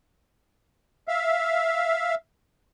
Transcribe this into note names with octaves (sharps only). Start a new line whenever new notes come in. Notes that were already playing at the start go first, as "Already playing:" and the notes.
E5 F5